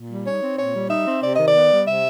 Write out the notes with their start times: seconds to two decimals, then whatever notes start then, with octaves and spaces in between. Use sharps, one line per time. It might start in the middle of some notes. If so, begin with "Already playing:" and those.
Already playing: A#2
0.09 G3
0.26 D#4 C#5
0.42 C4
0.58 A#2 C#5
0.73 G3
0.90 D#4 E5
1.06 C4
1.22 C3 D5
1.35 D#3 D#5
1.48 D5
1.54 B3
1.71 G3
1.86 C3 E5